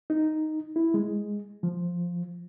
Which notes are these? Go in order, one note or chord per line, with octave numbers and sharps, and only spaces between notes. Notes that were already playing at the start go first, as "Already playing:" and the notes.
D#4
E4
G#3
F3